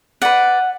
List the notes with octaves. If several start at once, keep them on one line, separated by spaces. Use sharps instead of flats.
B4 D5 F#5